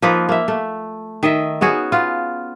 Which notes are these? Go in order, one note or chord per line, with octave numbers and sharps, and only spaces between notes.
F3 A#3 D#4 B4
A#3 E5
A3
D#3 D#5 E5
B3 C#4 F#4 G#4
B3 F4